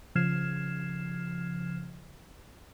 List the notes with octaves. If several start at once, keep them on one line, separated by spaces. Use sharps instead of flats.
C#3 F3 F6 G#6 C7 E7